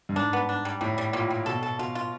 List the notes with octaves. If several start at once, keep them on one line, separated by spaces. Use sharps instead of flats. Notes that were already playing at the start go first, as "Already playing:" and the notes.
G2
G#2 D4
B3
D4
G3
A2 G3
G3
A#2 G3
G3
B2 A4
A4
B2 F4
F4